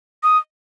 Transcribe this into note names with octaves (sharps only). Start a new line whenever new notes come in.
D#6